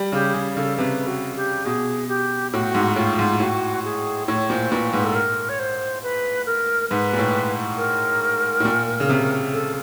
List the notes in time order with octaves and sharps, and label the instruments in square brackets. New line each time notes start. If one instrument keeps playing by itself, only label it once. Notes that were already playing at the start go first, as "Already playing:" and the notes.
Already playing: [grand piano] G3
[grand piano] C#3 [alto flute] G4
[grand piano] C#3 [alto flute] G#4
[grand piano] C#3 [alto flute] A4
[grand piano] C3 [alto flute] B4
[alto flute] F#4
G4
[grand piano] B2 [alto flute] G#4
[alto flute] G4
[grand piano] A2 [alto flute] F#4
[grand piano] G#2
[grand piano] A2 [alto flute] F4
[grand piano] G#2
[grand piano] A2 [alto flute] F#4
[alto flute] G#4
[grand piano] A2 [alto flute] C#5
[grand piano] A#2 [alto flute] C5
[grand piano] A#2 [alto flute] B4
[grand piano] G#2 [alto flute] B4
[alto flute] A4
A#4
C#5
C5
B4
A#4
[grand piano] G#2 [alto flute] B4
[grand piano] A#2
A2
[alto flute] A#4
[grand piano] A2
A#2
C#3
C3
[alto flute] A4